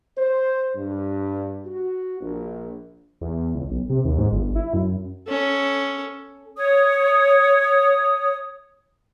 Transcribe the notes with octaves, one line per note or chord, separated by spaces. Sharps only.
C5
G2
F#4
A#1
E2
C#2
B1
C3
D#2
G#2
G1
E4
F#2
C#4 A4
C#5 D#6